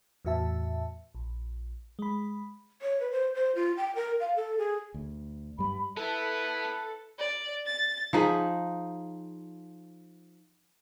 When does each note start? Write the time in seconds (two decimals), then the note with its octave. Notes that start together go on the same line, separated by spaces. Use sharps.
0.25 E2 A2 F#4 E5 A5
1.15 A#1
1.99 G#3 B5
2.82 C#5
3.00 B4
3.12 C5
3.35 C5
3.55 F4
3.77 G5
3.95 A#4
4.20 F5
4.36 A4
4.59 G#4
4.94 D2
5.58 G2 G3 B5
5.97 B3 E4 A4 B4
7.19 D5
7.66 A6
8.13 F3 D#4 G#4 B5